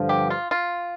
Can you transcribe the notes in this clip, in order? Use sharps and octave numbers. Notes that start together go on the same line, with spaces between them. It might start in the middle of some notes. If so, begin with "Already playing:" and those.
Already playing: G2 D3 F3
G4
F4
F4